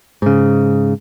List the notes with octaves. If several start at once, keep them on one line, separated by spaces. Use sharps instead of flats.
G#2 C#3